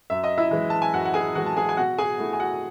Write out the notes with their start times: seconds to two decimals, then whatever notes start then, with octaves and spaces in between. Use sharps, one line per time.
0.10 F#2 E5
0.24 D#5
0.38 E4 E5
0.51 E3 G#3
0.70 A5
0.82 G#5
0.93 F#2 F#4 F#5
1.05 F#5
1.14 G#4 G#5
1.35 E3 G#3 F#4 F#5
1.46 A5
1.57 G#4 G#5
1.69 G#5
1.77 B2 F#4 F#5
1.98 G#4 G#5
2.19 A3 E4
2.33 G#5
2.40 F#4 F#5